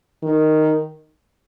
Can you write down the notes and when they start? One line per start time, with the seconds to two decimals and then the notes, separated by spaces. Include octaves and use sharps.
0.23 D#3